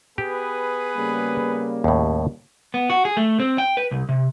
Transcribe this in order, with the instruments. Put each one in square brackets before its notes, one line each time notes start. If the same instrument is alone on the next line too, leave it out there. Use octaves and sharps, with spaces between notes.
[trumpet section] B3 G#4 B4 [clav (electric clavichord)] G4
[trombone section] C#3 G3 A#3
[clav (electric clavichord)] D#2 A2
[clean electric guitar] B3
F#4
G#4
A3
C4
G5
B4
C2
C3